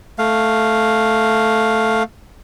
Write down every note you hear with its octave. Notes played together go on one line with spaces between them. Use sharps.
A3 F5